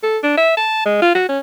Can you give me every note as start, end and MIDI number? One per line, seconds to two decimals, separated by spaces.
0.03 0.18 69
0.23 0.35 62
0.37 0.52 76
0.57 0.85 81
0.85 0.99 56
1.02 1.13 65
1.15 1.26 66
1.28 1.39 61